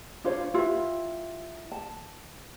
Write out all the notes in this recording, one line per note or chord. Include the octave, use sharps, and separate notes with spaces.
D4 F4 C5 C#5
E4 F4 G4 B4
A5